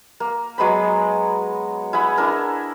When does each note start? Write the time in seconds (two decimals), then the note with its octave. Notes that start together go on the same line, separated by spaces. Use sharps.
0.20 A#3
0.58 F#3 G#3 B3 B5
1.93 E4 G#4 F#5 B5
2.18 D4 E4 A#4